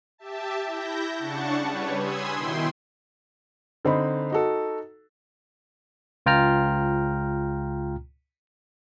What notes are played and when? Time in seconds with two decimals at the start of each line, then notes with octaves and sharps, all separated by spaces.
0.18 G4 E5 A5
0.66 E4 G6 A#6
1.19 C#3 D4 F#5 A5 C#6
1.59 G3 B4 C#5
1.95 G#5 B5 C6 D#6 E6 G#6
2.34 B2 D#3 E4 G5 C6
3.85 D3 C4 D#4 B5
4.30 D#4 F#4 A4
6.26 C#2 F4 G5 A#5 F6